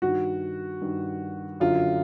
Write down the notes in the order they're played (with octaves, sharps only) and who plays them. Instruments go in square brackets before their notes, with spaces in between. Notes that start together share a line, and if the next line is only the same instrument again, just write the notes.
[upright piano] G2 D#3 F#4
G2 D#3
F#2 D3 F4